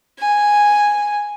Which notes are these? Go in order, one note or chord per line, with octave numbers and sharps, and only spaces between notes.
G#5